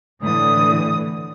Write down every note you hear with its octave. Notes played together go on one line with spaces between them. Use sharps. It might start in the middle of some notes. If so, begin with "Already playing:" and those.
A2 D3 E3 D#6